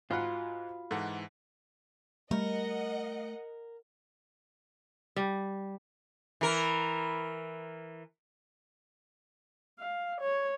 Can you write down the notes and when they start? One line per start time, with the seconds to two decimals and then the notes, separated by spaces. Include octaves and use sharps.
0.11 G#2 F4 F#4 F5 F#5 B5
0.91 G#2 E3 A4 F#5
2.31 G3 A3 A#4 D#5 F#5
5.16 G3
6.41 E3 A#4
9.79 F5
10.21 C#5